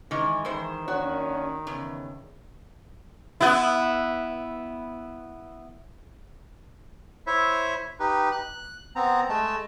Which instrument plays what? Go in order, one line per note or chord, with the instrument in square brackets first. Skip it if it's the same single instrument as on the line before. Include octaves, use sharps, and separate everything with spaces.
[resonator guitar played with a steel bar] D#3 E3 [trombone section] G#3
[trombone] D#3 [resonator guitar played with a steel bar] E3 C5
[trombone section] A#3 C#4 D4 [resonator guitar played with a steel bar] F#4
[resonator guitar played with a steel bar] E2 [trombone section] C#3
[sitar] B3 E4
[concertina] E4 C5 C#5 E5
D#4 G4 B4
F#6
B3 C4 A#5
G#3 A3 A5